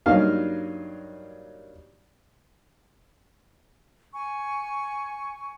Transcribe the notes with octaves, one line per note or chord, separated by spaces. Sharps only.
G2 F#3 A#3 D#4 F5
G#5 C#6